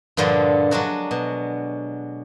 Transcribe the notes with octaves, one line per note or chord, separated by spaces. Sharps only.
G2 A#2 D3 F3 G3
F#3 G#3 D4 F#4
B2